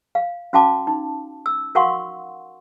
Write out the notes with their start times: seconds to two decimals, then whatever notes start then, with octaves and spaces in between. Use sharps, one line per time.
0.15 F5
0.53 C#4 F#4 F5 A5 D6
0.87 D#4
1.46 E6
1.75 F#4 A#4 F5 F#5 C6 C#6